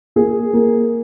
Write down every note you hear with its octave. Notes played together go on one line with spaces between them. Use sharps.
A#3 G#4
A#3